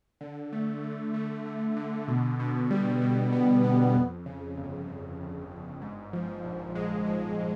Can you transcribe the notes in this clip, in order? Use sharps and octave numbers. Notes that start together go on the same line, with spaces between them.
D3
A3
D3
A3
D3
D3
B2
B2
G3
B2
B3
B3
F2
C#3
G1
C#3
G1
G1
G#2
F3
A#1
G#3
F3